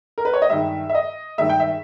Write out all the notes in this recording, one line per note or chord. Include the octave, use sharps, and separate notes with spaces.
A#4
B4
C#5
D#5
G2 D#3 G#3 E5
E5
D#5
G2 D#3 G#3 E5
G5
E5